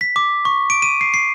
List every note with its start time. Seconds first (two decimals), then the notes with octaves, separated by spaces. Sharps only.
0.01 B6
0.16 D6
0.45 C#6
0.70 D7
0.82 D#7
1.01 C7
1.14 C7